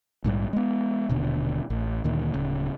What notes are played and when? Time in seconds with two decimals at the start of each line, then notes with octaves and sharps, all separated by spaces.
0.24 A#1 G#2 G3
0.53 G#3 B3
1.09 D#1 B2 D3
1.70 A1
2.04 D2 A#2 D#3
2.34 D1 C#3